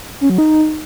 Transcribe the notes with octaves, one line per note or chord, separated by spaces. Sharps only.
C#4
F#3
D#4